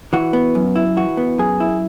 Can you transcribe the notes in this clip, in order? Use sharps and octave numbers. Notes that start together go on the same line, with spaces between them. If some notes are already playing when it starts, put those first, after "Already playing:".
E3 F#4
B3
F#2
E4
E3 F#4
B3
F#2 G#4
E4